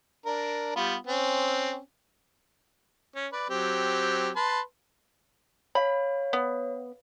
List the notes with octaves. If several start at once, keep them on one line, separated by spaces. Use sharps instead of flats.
D4 A#4
G3 B3 F4
C4 C#4
C#4
B4 D5
F#3 C4 G4
B4 A5 C6
C#5 F5 B5
B3